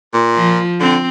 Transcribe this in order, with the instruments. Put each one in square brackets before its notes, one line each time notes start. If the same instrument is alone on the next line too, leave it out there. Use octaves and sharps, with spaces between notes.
[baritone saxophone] A#2
[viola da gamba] F3
[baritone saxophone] D3 [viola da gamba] C4